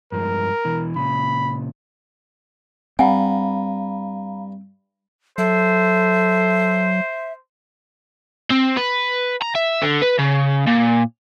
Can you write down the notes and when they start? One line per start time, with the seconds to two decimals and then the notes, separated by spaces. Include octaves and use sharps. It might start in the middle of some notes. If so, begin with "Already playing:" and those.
0.12 G2 F3 G#3 A#4
0.65 B2 E3
0.96 A#2 C#3 B5
2.99 G2 C4 F5 F#5 G#5 A#5 B5
5.38 F#3 A4 C5 E5
8.51 C4
8.77 B4
9.42 A#5
9.55 E5
9.82 D3
10.02 B4
10.19 C#3
10.67 A#2